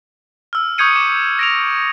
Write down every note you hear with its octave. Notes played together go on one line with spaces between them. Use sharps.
E6 F6
C#6 D#6 G6 G#6 C#7 D#7
D6
A#6 D7 F7